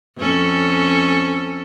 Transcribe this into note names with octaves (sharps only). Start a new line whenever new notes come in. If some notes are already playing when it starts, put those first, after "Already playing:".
F2 C#4 A4